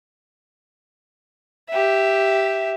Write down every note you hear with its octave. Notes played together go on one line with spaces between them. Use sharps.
G4 E5